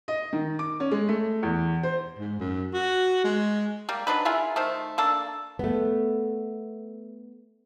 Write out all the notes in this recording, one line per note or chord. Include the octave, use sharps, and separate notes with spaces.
D#5
D#3
D6
C#4
G#3
A3
E2
C5
G#2
F#2
F#4
G#3
G3 A#3
F#3 D4 D#4 B4
E4 F4 G#4 A#4
D#3 A3 C5
A#3 D4 A4
A3 B3